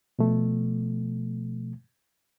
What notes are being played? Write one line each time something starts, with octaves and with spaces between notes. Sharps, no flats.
B2 F3 A3